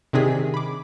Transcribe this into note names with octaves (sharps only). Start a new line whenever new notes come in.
C3 D#3 D4 D#4 G#4 B6
B5 D6